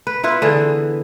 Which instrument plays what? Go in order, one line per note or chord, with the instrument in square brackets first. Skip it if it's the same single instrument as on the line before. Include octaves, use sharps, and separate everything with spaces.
[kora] B4
B3 E4 F4 B4
D3 E3 G#4